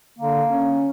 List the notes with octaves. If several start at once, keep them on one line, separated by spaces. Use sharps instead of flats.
D3 A#3
C#4